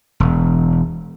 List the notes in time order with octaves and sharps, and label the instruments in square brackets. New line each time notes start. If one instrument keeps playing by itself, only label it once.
[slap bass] E1